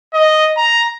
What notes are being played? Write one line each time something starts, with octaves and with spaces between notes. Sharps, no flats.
D#5
A#5